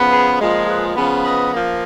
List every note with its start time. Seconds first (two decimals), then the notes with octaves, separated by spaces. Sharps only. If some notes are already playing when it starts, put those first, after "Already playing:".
Already playing: C#3 F3 B3
0.12 G#4 B4
0.39 A#2 F3 G#3
0.67 G#4 B4
0.96 C#3 F3 B3
1.24 B4 D#5
1.53 F3 A#3